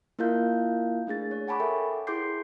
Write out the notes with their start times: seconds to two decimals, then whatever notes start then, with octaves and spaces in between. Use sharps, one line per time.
0.19 A#3 E4 F4 A#4 F5 G6
1.07 A3 D4 G#4 A6
1.31 C#5
1.48 F#5 G#5 A5 B5 C#6 D6
1.60 A4 A#4 C#5 E5 G5
2.07 E4 G#4 C6 D6 G6 C7